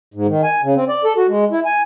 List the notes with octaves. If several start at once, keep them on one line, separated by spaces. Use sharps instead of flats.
G#2
D#3
G#5
C#3
C4
D5
A4
F#4
G#3
E4
G#5